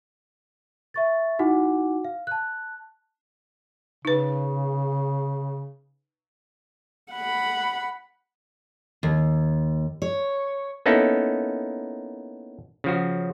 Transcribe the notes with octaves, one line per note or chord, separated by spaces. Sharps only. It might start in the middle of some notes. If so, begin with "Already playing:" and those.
E5 C#6 A6
D#4 E4 F#4 F#5 G#5 D6
F5
A5 F#6
C#3 D#4 B4
F#5 B5
D#2
C#5
A#3 B3 C#4 D#4 E4 A4
C#3 F3 F#4